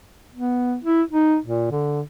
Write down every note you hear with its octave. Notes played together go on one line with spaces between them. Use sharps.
B3
E4
D#4
A#2
D3